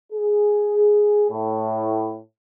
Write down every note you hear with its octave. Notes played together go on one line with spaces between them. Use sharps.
G#4
A2